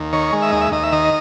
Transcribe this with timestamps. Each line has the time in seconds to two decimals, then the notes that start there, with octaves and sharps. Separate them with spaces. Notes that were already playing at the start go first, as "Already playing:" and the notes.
Already playing: D#2
0.13 D#3 C#5
0.33 G#3
0.42 E5
0.52 D#2 D#5
0.61 E5
0.72 D#2 D#5
0.83 E5
0.92 D#3 D#5